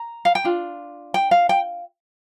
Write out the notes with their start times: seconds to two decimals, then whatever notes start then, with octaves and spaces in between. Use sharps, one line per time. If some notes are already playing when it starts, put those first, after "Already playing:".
Already playing: A#5
0.25 F5
0.35 G5
0.44 D4 F4
1.14 G5
1.31 F5
1.49 G5